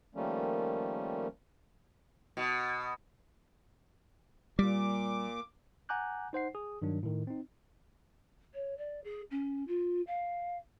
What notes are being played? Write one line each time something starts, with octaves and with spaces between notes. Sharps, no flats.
D#3 F3 G3 A3 A#3 C#4
B2
A#2 G3 D6
F#5 G#5 A#5 D6 F#6 G6
D#4 C5 F#5 C7
G#4 D#6
G2 D#3 F#3 D4
A2 D#3
C4 D#4
C#5
D5
G#4
C#4
F4
F5